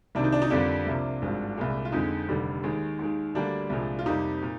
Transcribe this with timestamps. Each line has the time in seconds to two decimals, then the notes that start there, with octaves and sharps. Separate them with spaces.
0.15 C2 C3 D#3 A#3 D4
0.24 D#4
0.32 D4
0.42 D#4
0.50 F2 D3 G3 A#3 D4 F4
0.86 C2 C3 F3 A#3
1.22 G#1 G2 F3 G#3
1.57 C2 A#2 G#3
1.85 F4
1.92 F2 D3 G#3 D#4
2.28 F1 D#2 D3 G3
2.63 D#2 D#3 G#3
2.99 D#2 D#3 G#3
3.34 D2 D3 G3 A#3 D4
3.70 C2 A#2 F3 G#3
3.99 F4
4.05 F2 C3 G3 A#3 D#4
4.42 A#2